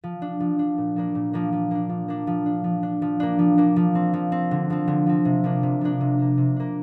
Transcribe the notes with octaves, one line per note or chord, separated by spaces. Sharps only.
F3
D4
F3
D4
A#2
F3 A#3 D4
A#2
F3 A#3 D4
F3
A#3 D4
F3
A#3 D4
F3
D4
F3
D4
F3
A#3 D4
F3
A#3 D4
F3
C4
F3
C4
D3
F3 C4
D3
F3 C4
C3
F3 A#3 D4
C3
F3 A#3 D4
C3
A#3 D4
C3
A#3 D4